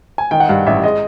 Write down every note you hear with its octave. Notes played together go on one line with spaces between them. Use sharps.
G#5
D#3 G5
F#5
G2 F5
A1 E5
G#3 D#5